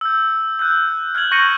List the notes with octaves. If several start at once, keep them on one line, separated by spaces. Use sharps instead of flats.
E6 G6
E6 F#6 G6
F6 G6 G#6 F#7
C#6 G6 A#6 C#7 D#7 F#7